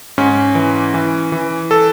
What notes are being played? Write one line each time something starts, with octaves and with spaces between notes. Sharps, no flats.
G#2 C#4
E3
E3
E3
A4